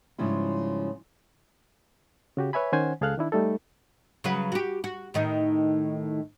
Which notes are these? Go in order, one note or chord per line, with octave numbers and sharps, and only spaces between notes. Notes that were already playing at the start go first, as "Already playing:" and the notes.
G#2 C#3 F3 G3 E4
C#3 F#4 G4
B4 C#5 E5 G#5 B5
D#3 C#4 C5 F#5 G#5
C#2 G#4 A4 F5 F6 F#6
D#3 D4 E4
G3 A3 D#4 A4
C#3 F#3 B4
F#4 G4
F#4
A2 D#3 D#4